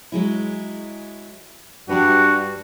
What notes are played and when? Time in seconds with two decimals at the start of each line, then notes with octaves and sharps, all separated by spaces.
0.12 F#3 G#3 E4
1.89 G2 G3 F#4 B4